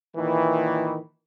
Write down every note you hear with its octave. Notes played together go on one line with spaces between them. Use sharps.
A#2 D#3 E3